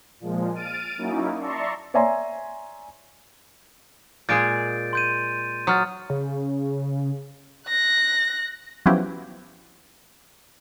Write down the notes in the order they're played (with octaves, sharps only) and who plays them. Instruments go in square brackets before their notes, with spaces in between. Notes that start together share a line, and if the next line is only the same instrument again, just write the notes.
[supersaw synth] A#2 F3 G#3
F6 A6 D7 D#7
F#3 A#3 C#4 D#4 E4
D5 E5 A5 A#5 C6 C#6
[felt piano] C#5 D5 E5 G#5 A#5 C6
[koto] A#2 G#3 G#4 [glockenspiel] G6 A6 D7
[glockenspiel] C6 G6 D#7
[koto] F#3 [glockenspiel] D#6 F6 A6
[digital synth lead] C#3
[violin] F#6 A#6
[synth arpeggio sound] F3 F#3 B3 C#4 E4 G4